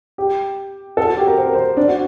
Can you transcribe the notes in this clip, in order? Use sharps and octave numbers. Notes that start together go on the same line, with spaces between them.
G4
A4
F#4
G4
A#4
C5
A#4
C5
D4
F#4